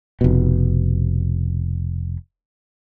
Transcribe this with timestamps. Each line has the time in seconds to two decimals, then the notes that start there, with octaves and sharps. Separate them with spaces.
0.21 F1 B2